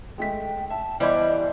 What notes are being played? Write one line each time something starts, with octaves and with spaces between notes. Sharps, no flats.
G#3 A3 G5 B6
E5 A5
E3 G3 B3 E4 C5 D#5